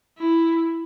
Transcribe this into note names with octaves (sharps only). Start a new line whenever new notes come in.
E4